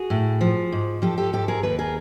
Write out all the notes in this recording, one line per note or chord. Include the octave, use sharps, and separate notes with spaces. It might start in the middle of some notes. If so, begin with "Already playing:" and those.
Already playing: F#4 G#4
A2
F3
G#2
F3 G4 A4
G4 A4
G#2 G4 A4
G#4 A#4
D#2 A4 B4
G#4 A#4